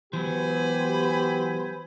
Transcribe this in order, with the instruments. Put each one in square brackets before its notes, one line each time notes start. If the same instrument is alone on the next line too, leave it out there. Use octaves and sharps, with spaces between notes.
[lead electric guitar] E3 F#3 [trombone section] B3 G4 [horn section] C5 G#5 B5